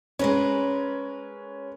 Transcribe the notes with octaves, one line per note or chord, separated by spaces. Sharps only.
G#3 C#4 A#4 B4